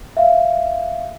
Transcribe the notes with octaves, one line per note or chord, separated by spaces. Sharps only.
E5 F5